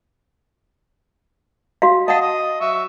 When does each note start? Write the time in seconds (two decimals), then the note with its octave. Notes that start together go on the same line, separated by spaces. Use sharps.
1.82 F#4 F5
2.08 D#5 F5 F#5 A5 D#6
2.22 D#5 D#6
2.61 F#3 E5 C#6